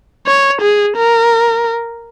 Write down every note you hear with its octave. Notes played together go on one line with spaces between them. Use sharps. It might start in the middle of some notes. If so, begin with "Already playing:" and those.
C#5
G#4
A#4